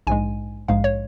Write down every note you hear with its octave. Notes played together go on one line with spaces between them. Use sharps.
A#1 G#2 G#3 G#5
A#1 G#2 G#3 F5
C#5